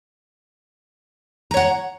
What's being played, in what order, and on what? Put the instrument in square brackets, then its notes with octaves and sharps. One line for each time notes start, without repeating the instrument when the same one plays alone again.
[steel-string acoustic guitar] A#5
C#5
F#5